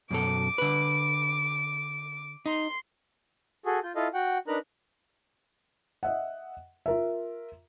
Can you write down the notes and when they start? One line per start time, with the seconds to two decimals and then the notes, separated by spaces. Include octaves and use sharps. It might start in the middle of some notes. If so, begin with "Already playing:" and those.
0.11 F#2 B2 A4 D6
0.58 D3 B4
2.46 D#4 C6
3.66 F#4 G#4 A4
3.84 F4 G6
3.95 E4 F4 A4 D#5 F5
4.14 F#4 F#5 G5
4.48 D4 D#4 A#4 B4 A#5 F#6
6.03 D#5 E5 F#5
6.86 F4 A#4 E5